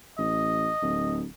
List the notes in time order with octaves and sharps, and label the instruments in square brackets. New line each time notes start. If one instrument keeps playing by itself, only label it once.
[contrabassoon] A1 [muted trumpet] D#5
[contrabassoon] D1